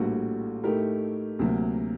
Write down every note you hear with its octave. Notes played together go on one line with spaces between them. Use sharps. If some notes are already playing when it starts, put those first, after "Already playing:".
Already playing: A#1 A2 G3 A#3 F#4
A2 A3 D#4 G4 A#4
D2 C3 F#3 A#3